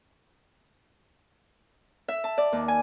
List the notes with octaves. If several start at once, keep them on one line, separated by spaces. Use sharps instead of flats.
E5
A5
D5
D#2
G#5